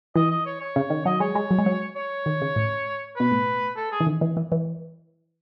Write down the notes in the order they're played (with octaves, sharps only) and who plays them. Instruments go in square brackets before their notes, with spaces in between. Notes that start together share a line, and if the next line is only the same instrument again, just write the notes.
[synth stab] E3 [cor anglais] D#5
[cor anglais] D#5
C#5
C#5
[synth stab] C#3
D#3
[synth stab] F#3 [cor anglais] D#5
[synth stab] G#3 [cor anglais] C#5
[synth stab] G#3
F#3
G#3
F#3
[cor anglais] C#5
[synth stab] D#3
C#3
A2
[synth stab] B2 [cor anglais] B4
[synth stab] A2
[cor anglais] A4
G#4
[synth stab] E3
D#3
E3
E3
E3